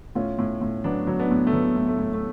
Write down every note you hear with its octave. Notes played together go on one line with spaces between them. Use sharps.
A2 C#4 F4
A2
A2
F#3 B3 D4
F#3
B3 D4
A2
A3
F#3 B3
A2
A3
A2
A3